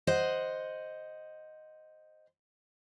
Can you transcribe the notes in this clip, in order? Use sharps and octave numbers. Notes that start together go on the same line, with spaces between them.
C5 D#5 F#5